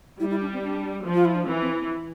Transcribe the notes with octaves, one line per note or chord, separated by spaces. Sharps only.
G3 E4
E4
D4
C4
D4
F3
F4
E4
D4
E3 C4
C4